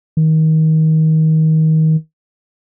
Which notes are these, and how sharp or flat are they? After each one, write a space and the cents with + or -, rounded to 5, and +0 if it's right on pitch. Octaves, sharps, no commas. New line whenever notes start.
D#3 +25